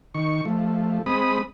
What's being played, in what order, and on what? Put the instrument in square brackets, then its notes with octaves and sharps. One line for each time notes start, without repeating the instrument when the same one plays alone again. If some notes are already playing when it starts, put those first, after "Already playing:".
[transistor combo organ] D#3 C#6
F3 A3
G#3 C4 B5 D#6